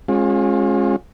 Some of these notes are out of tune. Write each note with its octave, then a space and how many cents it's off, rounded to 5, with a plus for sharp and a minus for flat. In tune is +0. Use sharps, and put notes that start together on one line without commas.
G#3 +0 C#4 -40 F4 +25